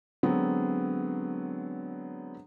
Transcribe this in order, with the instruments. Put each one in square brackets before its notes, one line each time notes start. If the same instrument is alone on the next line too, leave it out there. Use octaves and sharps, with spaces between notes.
[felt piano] D3 F#3 G#3 B3 C4